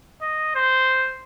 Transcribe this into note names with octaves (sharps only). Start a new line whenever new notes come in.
D#5
C5